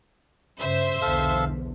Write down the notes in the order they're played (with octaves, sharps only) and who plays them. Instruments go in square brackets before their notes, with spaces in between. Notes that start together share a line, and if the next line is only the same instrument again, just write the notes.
[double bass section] G2 C#3 [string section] C5 E5
[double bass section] B1 E2 D3 [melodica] A4 F5